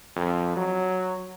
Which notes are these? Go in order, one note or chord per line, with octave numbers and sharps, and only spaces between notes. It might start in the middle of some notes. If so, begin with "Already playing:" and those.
F2
F#3